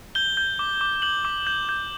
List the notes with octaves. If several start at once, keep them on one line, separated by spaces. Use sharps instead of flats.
G6 G7
G6
D6
D6
G6 F#7
D6
G6
G6